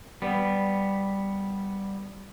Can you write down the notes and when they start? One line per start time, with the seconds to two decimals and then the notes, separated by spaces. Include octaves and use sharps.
0.22 G3 B3